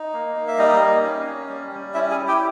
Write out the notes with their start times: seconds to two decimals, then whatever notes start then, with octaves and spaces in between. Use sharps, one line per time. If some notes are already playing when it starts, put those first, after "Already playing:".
Already playing: D#4
0.13 A#3
0.36 A#3
0.48 E5
0.58 G3 D#4 D#5
0.81 A#3
1.04 C#4
1.26 C#4
1.49 G3
1.72 G3
1.94 C#4 E4 E5
2.11 G#4 G#5
2.17 E4
2.28 G4 G5